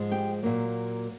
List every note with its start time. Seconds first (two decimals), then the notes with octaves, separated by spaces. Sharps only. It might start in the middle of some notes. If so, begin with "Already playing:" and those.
Already playing: G#2 F3 G#3
0.12 G4 G5
0.43 A#2 F#3 A#3